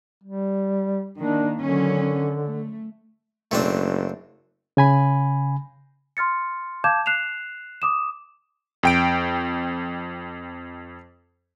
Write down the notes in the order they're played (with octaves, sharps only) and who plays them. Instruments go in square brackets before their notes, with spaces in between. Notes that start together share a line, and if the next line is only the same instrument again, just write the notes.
[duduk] G3
[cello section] D#3 A#3 [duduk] D4
[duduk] D3 [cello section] D#3 F#3 C#4
[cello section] A3
[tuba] F#1 [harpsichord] A3 C4 D4
[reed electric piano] C#3 G#5 B5
[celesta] C6 F6 A6 C#7
F5 A5 D6 G6 G#6 E7
F#6 C7 E7 F7
D6 D#6 E7
[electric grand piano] F2 G5 D7